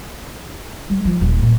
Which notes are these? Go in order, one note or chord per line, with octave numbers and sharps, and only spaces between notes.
G3
F3
D#1
A#2